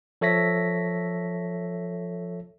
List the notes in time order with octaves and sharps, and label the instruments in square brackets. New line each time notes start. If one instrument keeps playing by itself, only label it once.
[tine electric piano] F3 A4 C#5 E5 A#6 B6